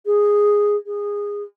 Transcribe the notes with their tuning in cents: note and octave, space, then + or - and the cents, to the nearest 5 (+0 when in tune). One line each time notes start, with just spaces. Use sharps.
G#4 -5
G#4 -20